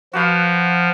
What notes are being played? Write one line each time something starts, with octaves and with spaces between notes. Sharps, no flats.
F3 F#4 B4 F5